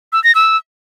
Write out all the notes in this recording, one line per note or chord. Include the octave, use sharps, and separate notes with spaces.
E6
A#6
E6